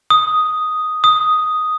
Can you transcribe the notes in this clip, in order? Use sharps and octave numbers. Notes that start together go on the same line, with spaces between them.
D#6
D#6